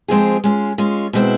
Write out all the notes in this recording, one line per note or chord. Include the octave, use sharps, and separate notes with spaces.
F3 G#3 C4 F4 G#4
G#3 C#4 F4
G#3 C#4 F4
B2 G#3 C4 E4